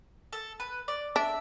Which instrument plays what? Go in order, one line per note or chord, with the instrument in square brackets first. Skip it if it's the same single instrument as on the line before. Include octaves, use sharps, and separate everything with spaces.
[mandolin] A4
B4
D5
[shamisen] D4 [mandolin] E5